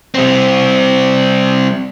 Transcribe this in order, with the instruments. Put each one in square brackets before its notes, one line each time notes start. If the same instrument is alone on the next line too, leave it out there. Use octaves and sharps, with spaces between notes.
[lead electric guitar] G3 C4